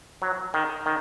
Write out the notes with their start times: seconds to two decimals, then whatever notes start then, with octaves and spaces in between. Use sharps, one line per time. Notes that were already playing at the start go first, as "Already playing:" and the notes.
0.22 F#3
0.54 D#3
0.86 D#3